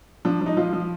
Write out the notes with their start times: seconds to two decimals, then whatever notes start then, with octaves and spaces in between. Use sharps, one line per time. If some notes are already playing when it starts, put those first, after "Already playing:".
0.25 F3 D4
0.41 F3
0.46 D#4
0.57 F3 F4
0.73 F3